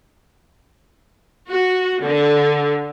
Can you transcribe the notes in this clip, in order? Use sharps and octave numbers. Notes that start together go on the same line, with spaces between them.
F#4
D3